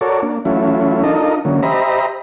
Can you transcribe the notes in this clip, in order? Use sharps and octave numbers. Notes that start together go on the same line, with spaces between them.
F#4 A4 A#4 C#5 D5
A#3 D4
E3 F#3 A3 C#4 E4 F4
D4 D#4 F4 A4 A#4 D#5
D3 E3 F#3 A#3 C#4
G4 C5 D#5 E5 A#5 B5